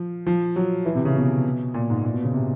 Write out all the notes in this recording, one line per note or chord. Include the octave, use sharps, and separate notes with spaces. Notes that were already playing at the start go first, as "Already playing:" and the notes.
Already playing: F3
F3
F#3
E3
C3
C#3
B2
A#2
G#2
A#2
B2
C#3
C3